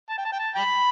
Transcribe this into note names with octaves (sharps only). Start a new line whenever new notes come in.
A5
G5
A5
G5
A5
G5 B5